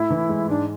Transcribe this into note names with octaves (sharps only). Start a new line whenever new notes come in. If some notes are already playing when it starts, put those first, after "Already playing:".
Already playing: A2 A3 E4
E3
G#3
G#2 D4